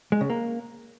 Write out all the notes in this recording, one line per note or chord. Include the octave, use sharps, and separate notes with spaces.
G#3
C#3
A#3